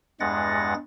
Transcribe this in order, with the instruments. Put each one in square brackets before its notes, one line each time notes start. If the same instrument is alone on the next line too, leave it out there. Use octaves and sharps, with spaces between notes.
[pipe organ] E2 G2 G#3 F#5 A6 A#6